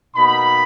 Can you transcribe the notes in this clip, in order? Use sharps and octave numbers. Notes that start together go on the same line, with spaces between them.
B2 A#3 D#4 B5